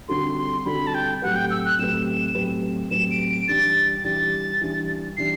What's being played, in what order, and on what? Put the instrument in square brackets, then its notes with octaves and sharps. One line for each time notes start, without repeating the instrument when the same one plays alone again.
[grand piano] D3 G3 C4 F#4 A4 [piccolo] C6
[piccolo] C6
[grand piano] D3 G3 C4 F#4 A4 [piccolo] B5
[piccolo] A5
G5
[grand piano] A2 F#3 C4 G4 B4 [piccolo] F#5
[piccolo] G5
E6
F#6
[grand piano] A2 F#3 C4 G4 B4 [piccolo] E7
[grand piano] A2 F#3 C4 G4 B4
[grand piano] A2 F#3 C4 G4 B4 [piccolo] E7
[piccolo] D7
D7
[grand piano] E3 G3 D4 G4 [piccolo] A6
[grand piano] E3 G3 D4 G4 [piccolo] A6
[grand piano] E3 G3 D4 G4
[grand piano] E3 G3 D4 G4 [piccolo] C7